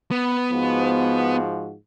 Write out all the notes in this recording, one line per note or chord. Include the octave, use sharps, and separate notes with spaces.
B3
G#2 F3 F#4